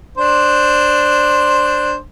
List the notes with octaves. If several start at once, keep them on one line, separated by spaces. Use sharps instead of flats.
D4 C5